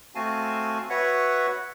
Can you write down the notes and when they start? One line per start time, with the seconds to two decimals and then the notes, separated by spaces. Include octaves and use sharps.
0.15 A3 C4 F#4 F5 G#5 A5
0.90 F#4 B4 C#5 E5 F#5